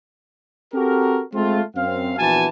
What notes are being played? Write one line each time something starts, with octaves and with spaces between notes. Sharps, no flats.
C4 F#4 G4 A4 A#4
G#3 A3 C4 F4
F#2 C4 F5
A#1 E3 B3 F#4 G#5 A5